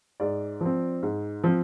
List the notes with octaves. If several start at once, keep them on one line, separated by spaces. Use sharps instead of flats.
G#2 D5
F3 C4
G#2
F3 C4